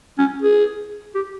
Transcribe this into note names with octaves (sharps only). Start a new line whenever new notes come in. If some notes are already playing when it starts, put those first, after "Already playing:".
C#4
G#4
G4